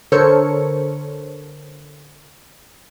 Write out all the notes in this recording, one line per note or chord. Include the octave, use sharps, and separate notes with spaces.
D3 A4 A#4 C5 C#5 C#7